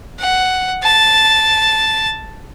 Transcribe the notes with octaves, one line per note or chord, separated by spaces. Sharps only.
F#5
A5